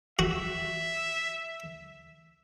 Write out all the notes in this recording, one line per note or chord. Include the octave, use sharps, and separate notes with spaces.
F#4 E5